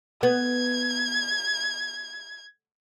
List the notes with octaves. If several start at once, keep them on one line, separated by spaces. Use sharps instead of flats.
B3 G#6